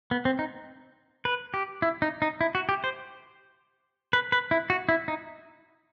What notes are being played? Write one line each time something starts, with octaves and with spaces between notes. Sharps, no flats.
B3
C4
D#4
B4
G4
E4
D#4
D#4
E4
F#4
G4
C5
B4
B4
E4
F#4
E4
D#4